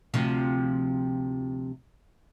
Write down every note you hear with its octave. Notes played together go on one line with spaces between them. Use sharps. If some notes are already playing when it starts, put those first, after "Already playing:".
D2 C3 F3